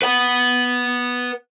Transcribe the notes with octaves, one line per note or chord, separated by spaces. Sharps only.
B4 F#5